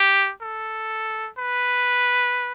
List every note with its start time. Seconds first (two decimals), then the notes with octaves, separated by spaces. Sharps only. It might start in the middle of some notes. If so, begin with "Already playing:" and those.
Already playing: G4
0.42 A4
1.39 B4